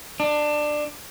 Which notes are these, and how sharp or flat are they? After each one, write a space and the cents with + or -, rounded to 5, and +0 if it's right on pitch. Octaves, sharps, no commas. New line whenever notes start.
D4 +20